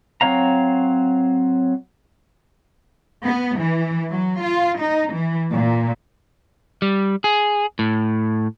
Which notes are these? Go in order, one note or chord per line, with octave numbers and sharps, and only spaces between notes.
F#3 C4 C#5 F5 A#5
B3
E3
F#3
F4
D#4
E3
A#2
G3
G#4
A2